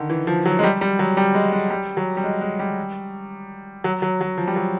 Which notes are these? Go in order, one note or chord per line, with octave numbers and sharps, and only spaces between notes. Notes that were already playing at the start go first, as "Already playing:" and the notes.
Already playing: D3 D#3
E3
F3
F#3
G#3
G3
G3
F#3
G3
G#3
G#3
G3
F#3
G3
G#3
G#3
G3
F#3
F#3
F#3
F3
G3
F#3